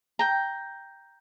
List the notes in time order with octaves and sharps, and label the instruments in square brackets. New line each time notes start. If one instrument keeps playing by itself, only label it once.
[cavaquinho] G5 A#5